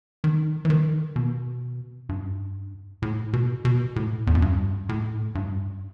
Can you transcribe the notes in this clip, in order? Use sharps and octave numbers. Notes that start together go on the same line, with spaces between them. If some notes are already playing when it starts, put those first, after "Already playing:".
D#3
E3
D#3
B2
G2
A2
B2
B2
A2
E2
F#2
G2
A2
G2